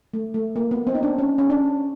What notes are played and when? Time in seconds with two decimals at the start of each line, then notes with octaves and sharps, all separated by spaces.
0.14 A3
0.34 A3
0.56 A#3
0.71 B3
0.87 C4
0.95 D#4
1.03 D4
1.18 C#4
1.38 C#4
1.50 D4